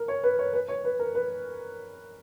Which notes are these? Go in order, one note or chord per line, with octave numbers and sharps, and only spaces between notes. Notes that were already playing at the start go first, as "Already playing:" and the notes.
Already playing: A#4
C#5
B4
C#5
B4
C#5
B4
A#4
B4